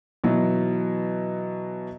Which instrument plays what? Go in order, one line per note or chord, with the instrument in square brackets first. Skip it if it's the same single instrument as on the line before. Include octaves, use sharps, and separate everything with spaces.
[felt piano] B2 E3 F#3